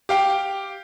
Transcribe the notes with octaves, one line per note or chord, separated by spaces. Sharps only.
G4 F5 G5